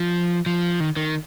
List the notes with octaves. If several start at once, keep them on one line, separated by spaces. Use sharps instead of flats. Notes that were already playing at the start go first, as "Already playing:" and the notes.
Already playing: F3
F3
D#3
D#3